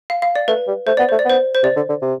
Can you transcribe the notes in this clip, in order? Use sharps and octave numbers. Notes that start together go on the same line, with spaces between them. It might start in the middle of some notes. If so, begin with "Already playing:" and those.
F5
F5
D5
A3 B4
G3
A3 C5
B3 D5
A3 C5
D5
B3 C5
C5
C3 D5
D3
D3
C3